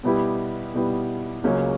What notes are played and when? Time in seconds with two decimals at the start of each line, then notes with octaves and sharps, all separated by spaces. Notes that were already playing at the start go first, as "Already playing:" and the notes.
0.03 B2 G3 B3 E4 G4
0.74 B2 G3 B3 E4 G4
1.44 C#2 C#3 F#3 A#3 C#4